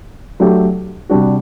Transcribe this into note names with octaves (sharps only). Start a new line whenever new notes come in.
F#3 A3 D4 G4
C3 G3 D4 F#4